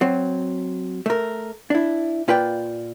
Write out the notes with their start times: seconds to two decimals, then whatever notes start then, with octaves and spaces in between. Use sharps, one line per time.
0.01 F#3 C4
1.06 A3 A#4
1.70 D4 E4
2.28 A#2 F4 B4 D5 G5